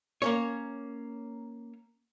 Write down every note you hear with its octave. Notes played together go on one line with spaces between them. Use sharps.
A#3 C#4 C#5